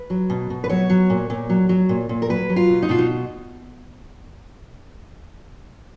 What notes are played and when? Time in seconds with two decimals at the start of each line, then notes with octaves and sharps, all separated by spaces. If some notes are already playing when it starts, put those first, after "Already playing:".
Already playing: B4
0.10 F#3
0.30 B2
0.50 B2
0.64 B4
0.70 F#3 C#5
0.90 F#3
1.10 A#2
1.30 A#2
1.50 F#3
1.69 F#3
1.89 A#2
2.09 A#2
2.22 A#4
2.30 F#3 B4
2.49 F#3
2.56 F4
2.69 B2
2.82 D#4
2.89 B2 F4
2.98 D#4